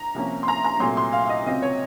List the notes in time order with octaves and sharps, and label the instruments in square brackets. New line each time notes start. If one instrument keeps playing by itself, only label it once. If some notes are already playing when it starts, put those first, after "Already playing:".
Already playing: [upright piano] A#5
C2 C3 F3 A#3 C#4
C6
A#5
A#5
C2 A#2 F#3 A3 C4 C6
C6
F5
F5
D#5
C#2 C3 F#3 C4 F4 D#5
C#5